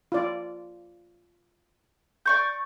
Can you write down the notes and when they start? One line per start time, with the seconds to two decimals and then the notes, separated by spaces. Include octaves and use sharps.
0.12 F4 D5
2.26 D5 C#6 G6